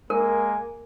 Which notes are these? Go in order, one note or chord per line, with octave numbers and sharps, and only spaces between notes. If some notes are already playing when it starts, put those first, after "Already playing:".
G#3 A#3 A#4 G#5